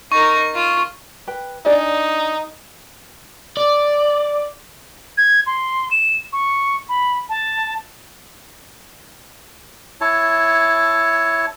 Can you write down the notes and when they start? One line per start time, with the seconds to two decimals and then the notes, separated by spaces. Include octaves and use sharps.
0.12 D#4 A#4 C#6
0.55 F4
1.27 B4 G5
1.66 D4 D#4 G#4 D5
3.57 D5
5.18 G#6
5.47 C6
5.91 E7
6.33 C#6
6.89 B5
7.29 A5
10.01 E4 C#5 A5